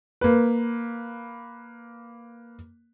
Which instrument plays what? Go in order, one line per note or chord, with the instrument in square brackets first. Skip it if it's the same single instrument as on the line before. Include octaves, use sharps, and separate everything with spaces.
[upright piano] A#3 B4